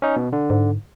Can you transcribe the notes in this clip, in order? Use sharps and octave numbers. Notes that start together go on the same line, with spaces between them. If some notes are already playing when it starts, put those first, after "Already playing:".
C#4 D#4
B2
D3
G#2